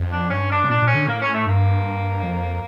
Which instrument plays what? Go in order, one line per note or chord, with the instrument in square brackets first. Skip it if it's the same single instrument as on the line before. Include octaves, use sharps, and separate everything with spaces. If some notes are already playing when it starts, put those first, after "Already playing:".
Already playing: [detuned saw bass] F2
[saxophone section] D4
[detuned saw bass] G2 [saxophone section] C#4
[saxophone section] D4
[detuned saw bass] C#3
[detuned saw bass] A#2 [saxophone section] D4
[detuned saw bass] A#2
[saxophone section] C#4
[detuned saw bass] D3
[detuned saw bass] A2 [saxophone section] A#3
[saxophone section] C#4
A3
[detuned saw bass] G2 [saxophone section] A#3
[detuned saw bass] F2